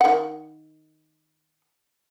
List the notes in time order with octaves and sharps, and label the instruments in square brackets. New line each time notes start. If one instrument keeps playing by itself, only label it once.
[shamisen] D#3 F#5